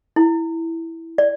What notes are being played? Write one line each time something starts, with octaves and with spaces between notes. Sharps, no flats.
E4
D5